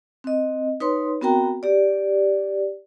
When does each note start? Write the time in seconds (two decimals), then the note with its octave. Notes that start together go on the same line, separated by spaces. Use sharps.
0.24 C4 D#5
0.80 D#4 B4 C#5 C6
1.21 B3 C4 F#4 A#4 G5 A#5
1.63 G4 D5